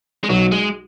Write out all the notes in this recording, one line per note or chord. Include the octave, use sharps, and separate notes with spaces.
G#3
B1 F#3
G#3